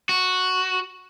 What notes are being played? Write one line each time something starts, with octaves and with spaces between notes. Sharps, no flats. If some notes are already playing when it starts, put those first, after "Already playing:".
F#4